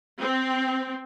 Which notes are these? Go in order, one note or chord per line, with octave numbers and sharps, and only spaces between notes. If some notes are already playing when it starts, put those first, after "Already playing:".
C4